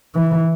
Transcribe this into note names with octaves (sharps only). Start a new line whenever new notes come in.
E3